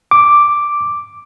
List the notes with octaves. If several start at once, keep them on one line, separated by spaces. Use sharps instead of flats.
D6